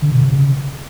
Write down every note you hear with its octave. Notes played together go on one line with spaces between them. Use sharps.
D3
B2
C3
C#3